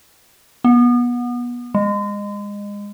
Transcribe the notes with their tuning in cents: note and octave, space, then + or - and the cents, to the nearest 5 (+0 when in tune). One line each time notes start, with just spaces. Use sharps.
B3 -25
G#3 -25